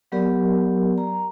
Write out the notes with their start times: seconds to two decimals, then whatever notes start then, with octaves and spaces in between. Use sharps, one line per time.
0.12 F#3 B3 G4 A#4 D5
0.98 A#5